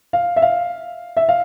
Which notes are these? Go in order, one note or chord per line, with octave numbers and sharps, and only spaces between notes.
F5
E5
F5
E5
F5